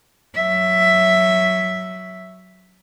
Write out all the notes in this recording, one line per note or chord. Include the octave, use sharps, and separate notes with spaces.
F#3 E5